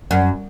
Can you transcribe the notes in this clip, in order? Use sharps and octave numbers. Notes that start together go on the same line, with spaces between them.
F#2